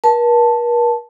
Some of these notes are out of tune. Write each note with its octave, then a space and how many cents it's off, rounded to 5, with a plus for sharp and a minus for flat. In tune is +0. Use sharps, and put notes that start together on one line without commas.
A#4 +45 A5 +0